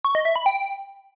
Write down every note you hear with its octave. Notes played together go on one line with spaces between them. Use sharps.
C#6
D#5
E5
B5
G5